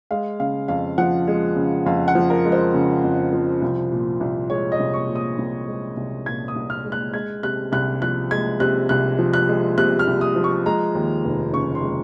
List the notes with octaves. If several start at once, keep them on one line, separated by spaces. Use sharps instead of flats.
G#3 F5
C#3 F5
F2 F5
F3 F#5
G#3
C#3
F2 F5
F#5
F3
A#4
G#3
C5
C#3
F2
F3
C2
A#2
C2
G#3 C#5
D#5
C2
C#6
A#2
D#6
C2
G#3
C2
A#2 G#6
D#6
C2
F6
G#3
F#6
G#3 G#6
C3 F#6
C2 F#6
F3 F#6
G#3 G#6
C3 F#6
C2 F#6
F3
F#6
G#3
C3 F#6
F6
C2
D#6
F3
C#6
G#3 A#5
D#2
F1
C#3 C#6
C6
G#3